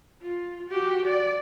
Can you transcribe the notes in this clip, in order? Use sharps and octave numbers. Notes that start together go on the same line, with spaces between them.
F4
F#4 G4
D5